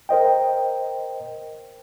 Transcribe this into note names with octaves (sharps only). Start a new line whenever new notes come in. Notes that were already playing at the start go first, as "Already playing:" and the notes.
A#4 C5 D#5 G5